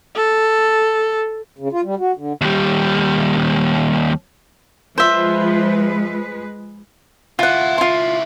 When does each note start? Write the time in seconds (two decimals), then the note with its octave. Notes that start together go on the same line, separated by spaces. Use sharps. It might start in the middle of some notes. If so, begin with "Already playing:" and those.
0.16 A4
1.59 C#3
1.72 F4
1.84 G3
1.99 F#4
2.17 D3
2.41 D#2 G3
4.98 F3 G#3 B4 C5 E5
7.39 C#2 E4 F4 F#5
7.78 F4 C6